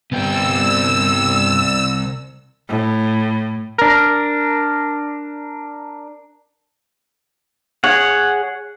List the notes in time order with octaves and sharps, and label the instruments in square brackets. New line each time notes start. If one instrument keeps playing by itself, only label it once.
[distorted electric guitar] C2 G5 [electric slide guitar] G2 B3 [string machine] E6
[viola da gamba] A2
[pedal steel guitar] D4 A#4
G#4 C#5 F#5